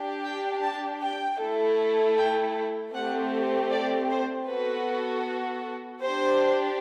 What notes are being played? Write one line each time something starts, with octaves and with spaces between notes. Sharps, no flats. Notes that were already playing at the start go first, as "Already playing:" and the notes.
Already playing: D4 G4
G5
A5
G5
A3 E4 A4
G5
A3 C4 G4 F#5
D5
C5
B3 F#4 A4 B4
D4 G4 C5